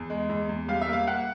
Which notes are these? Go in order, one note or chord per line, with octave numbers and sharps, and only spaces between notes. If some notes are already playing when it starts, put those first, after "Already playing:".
Already playing: E2
G#3
E2
E2
G3 F5
E5
A#3 F5
A#3 F#5